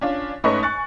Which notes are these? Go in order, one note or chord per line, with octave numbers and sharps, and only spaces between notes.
C#4 D4 F4
G#2 A3 C#4 B4 D#5 C#6
G#5 C#6 F#6 A6